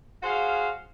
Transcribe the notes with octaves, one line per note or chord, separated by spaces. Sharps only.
F#4 G#4 C5 F5